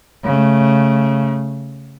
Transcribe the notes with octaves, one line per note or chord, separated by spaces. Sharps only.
C#3 A3